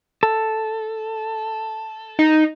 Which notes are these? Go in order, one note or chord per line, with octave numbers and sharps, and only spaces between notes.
A4
D#4